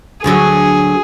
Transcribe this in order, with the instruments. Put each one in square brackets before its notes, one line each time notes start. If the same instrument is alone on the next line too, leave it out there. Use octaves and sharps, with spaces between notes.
[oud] D2 D3 F#3 [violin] G#4